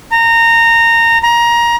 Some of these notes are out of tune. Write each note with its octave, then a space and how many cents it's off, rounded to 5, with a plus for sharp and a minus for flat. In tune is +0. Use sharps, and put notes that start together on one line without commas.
A#5 -20
A#5 +20